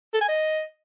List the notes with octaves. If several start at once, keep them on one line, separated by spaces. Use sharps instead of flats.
A4
G#5
D#5